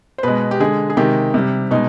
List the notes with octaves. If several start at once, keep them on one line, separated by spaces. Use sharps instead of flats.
C5
B2 G#3 B4
G4
D3 G#3 G#4
G#4
C3 D#3 G#3 G4
C3 G3
B2 G#3 D#4